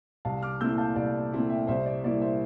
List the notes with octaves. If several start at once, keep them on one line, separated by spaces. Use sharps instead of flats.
C2 F5 A5
D6 F6
A#2 A3 C4 E4 E6 G6
F5 A5
C2 D5 F5
A#2 A3 C4 E4
E5 G5
C2 C5 E5
D5
A#2 G3 A#3 E4 D5
C5 E5